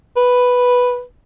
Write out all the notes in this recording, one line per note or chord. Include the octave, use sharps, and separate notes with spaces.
B4